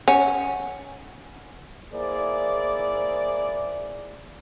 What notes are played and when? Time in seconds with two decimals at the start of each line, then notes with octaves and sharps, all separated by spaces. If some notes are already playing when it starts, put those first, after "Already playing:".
0.08 C#4 F#5
1.92 A#3 E4 G#4 C5 D5